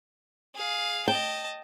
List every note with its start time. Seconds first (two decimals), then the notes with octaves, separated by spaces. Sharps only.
0.55 G#4 F5
1.08 D#5 G5 A5